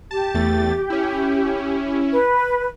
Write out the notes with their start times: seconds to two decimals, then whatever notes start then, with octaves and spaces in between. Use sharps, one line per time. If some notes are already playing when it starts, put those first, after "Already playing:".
0.11 G4 A5
0.34 E2 A3 A6
0.90 C#4 E4
2.13 B4